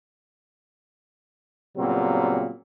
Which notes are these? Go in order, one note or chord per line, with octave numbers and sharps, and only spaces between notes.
A#2 C#3 F#3 G3 B3 C4